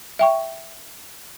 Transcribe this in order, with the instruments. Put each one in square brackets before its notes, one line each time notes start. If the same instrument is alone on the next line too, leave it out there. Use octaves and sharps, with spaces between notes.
[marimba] E5 G5 C#6